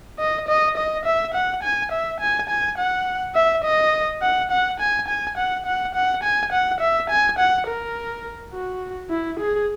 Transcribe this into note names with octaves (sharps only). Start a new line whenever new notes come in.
D#5
D#5
D#5
E5
F#5
G#5
E5
G#5
G#5
F#5
E5
D#5
F#5
F#5
G#5
G#5
F#5
F#5
F#5
G#5
F#5
E5
G#5
F#5
A#4
F#4
E4
G#4